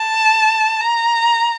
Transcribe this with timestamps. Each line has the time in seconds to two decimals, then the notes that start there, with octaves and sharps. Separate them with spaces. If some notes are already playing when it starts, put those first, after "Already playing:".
Already playing: A5
0.81 A#5